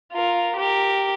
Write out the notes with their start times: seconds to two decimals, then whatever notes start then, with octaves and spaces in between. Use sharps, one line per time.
0.12 F4 A#4
0.57 G4 A#4